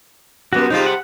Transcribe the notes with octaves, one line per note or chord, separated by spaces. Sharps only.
F#2 G3 B3 F#4
C3 G3 G#3 D#4 F4
F#5